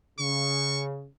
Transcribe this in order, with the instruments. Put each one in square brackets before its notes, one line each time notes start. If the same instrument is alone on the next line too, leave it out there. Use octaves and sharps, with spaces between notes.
[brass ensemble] C#3 [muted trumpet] C#6